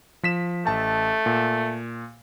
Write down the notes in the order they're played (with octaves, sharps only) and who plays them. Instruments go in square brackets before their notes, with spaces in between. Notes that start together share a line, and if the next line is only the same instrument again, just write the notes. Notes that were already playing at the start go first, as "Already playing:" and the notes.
[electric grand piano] F3 B6 E7
[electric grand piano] A1 A5 [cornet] A3
[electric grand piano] A#2